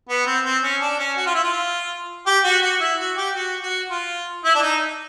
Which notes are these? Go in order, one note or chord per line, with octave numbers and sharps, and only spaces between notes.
B3
C4
C4
C#4
D4
C#4
F#4
F4
E4
F4
G4
F#4
F#4
E4
F#4
G4
F#4
F#4
F4
E4
D4
D#4